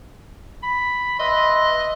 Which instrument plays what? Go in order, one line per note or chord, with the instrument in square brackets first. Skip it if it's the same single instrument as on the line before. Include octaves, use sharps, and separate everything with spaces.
[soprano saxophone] B5
[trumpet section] B4 E5 C6 [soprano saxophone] D#5